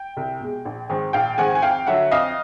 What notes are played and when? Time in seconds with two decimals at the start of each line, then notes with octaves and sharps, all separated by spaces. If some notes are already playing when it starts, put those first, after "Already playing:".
Already playing: G5
0.17 C2
0.40 B2 G#3
0.65 A#1
0.90 G#2 D#3 G#3 C4
1.13 A#1 F5 G5
1.38 G#2 D#3 G#3 C4 F#5 G#5
1.55 G#5
1.62 F2 F5 G5
1.87 D3 F#3 E5 F#5
2.11 F2 D#5 F5